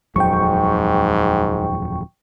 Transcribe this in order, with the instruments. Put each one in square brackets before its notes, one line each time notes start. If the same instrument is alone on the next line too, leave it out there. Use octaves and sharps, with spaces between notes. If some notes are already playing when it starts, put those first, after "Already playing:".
[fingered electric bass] D#1 F2 F#3 [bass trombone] G#2 [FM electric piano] G5 C#6